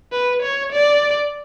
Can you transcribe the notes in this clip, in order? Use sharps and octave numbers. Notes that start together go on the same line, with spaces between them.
B4
C#5
D5